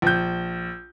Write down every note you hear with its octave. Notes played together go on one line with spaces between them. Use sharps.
A#1 G6